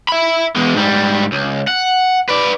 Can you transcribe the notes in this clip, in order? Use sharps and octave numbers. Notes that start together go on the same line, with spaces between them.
E5 B5
E2 G#3
G#2 G3
C#2
F#5
B4 D5